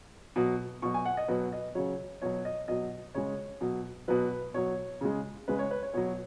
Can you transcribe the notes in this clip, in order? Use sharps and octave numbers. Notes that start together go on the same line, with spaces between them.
B2 F#3
B2 F#3 C#6
G#5
F#5
D#5
B2 F#3 B4
D#5
C#3 F#3 C#5
B2 F#3 C#5
D#5
B2 F#3 D#5
C#3 G#3 C#5
B2 F#3
B2 F#3 B4
B2 F#3 C#5
C#3 G#3
C#3 G#3 B4
C#5
B4
C#5
B2 F#3 C#5